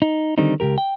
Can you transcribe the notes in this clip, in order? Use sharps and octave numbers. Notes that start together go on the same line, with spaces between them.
D#4
D3 D#3 G3 C4 D#4
C#2 C3 G4 A#4
G5